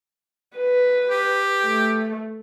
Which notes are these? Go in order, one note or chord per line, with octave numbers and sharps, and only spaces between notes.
B4
G4
A3